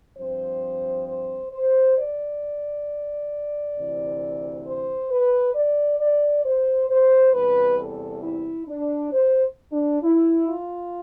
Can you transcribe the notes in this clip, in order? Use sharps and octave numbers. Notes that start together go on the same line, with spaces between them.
G2 F3 C4 C5
C5
C5
D5
D2 C3 E3
C5
B4
D5
D5
C5
C5
E2 C3 G3 B4
A4
E4
D4
C5
D4
E4
F4